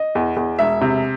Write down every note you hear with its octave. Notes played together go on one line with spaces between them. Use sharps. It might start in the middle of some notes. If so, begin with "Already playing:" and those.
Already playing: D#5
E2
E2
E1 E5
C3